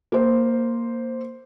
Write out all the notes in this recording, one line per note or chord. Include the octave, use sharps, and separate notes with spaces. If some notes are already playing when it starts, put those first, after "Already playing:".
A#3 C5